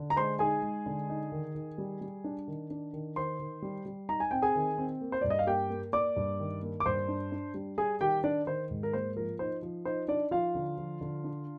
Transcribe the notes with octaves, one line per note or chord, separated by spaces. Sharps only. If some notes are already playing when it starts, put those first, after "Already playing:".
Already playing: D3
A#5
G#3 C5 C6
D#4 G#4 G#5
G#3
D3
D#4
D#3
D#3
G3
G3
D4
D#3
D4
D#3
D#3 C5 C6
D#3
G3
G3
D#4 A#5
G#5
C4 G5
G#4 G#5
D#3
C4
A#3
C5
G2 D5
D#5
F5
A#3 G4 G5
A#3
A#3 D5 D6
G2
D#3
A#3
D6
G2 C5 C6
D4
D4
G3
G3 G#4 G#5
D#3 G4 G5
D4 D5
D#3 C5
G#2
A#4
A#3 C5
F3 A#4
D#4 C5
F3
D#4 C5
D4 D#4 D5
F3 F4 F5
D3
F3
D3
D4